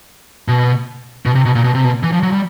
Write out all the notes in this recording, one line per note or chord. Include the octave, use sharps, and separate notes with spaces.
B2
B2
C3
B2
A#2
B2
C3
B2
E3
F3
F#3
G3